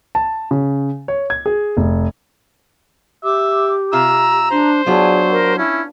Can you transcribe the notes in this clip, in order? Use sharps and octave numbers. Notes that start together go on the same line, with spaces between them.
A5
C#3
C#5
G#6
G#4
F1
G4 E5 D6
C3 F4 E5 A#5 E6
D4 C5
F#3 B3 D4 F4 G#4
A#4
C#4 E4